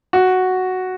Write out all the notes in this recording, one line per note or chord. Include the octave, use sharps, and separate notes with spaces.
F#4